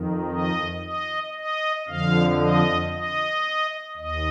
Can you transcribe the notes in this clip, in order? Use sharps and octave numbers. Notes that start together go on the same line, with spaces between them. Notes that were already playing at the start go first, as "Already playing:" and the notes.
Already playing: F2 D#3
D#5
D#5
D#5
F2 D3 F3 F5
D#5
D#5
D#2 D#5